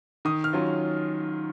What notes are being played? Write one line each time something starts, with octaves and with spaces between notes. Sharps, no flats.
D#3 D#6
F6
F#3 C#4 F4